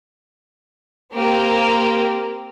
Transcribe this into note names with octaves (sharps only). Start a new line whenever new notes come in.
A#3 C4 G4 A#4